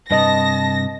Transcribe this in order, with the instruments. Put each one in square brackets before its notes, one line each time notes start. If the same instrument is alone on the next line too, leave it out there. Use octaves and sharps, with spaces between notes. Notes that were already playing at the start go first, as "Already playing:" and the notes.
[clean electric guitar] G2 C3 [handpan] B4 D#5 [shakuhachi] A5 [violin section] A#6